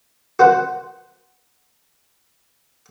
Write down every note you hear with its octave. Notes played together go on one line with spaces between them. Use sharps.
F#4 B4 C5 F#5